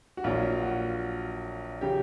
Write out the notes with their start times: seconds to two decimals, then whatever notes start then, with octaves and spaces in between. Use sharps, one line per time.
0.17 F#4
0.24 A#1 A#2 F#3 F4
0.63 F#4
1.81 C#3 F#3 G4